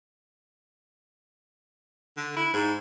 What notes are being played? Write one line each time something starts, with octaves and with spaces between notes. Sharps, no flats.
D3
E4
G#2